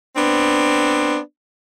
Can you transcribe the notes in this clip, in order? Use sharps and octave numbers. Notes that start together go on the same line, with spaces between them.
B3 C4 D4